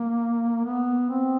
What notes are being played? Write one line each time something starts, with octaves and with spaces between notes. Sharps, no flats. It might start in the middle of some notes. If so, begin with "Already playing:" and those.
Already playing: A#3
B3
C4